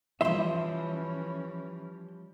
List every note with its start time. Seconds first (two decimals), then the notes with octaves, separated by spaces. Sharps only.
0.21 E3 F3 G3 C#4 E5 C6